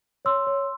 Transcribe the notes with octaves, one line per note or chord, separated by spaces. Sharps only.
C#5 C6 E6
C#5